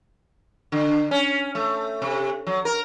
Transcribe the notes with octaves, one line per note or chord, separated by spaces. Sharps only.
D3
C#4
A3
C3
F#3
A#4